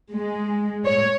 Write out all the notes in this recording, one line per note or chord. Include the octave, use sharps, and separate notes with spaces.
G#3
C#5